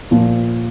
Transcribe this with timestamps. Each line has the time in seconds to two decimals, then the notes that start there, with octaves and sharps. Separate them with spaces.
0.11 A#2 F3